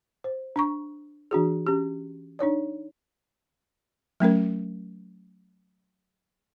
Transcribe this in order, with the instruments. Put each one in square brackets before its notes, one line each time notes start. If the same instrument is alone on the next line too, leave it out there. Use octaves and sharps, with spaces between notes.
[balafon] C5
D4 A#5 C#6
E3 D4 F#4 G#4
C#4 G4
D4 D#4 C#5 D5
F#3 A3 C#4 A#4